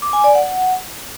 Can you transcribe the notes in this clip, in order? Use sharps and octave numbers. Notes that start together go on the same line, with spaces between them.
D6
G#5
D5
F#5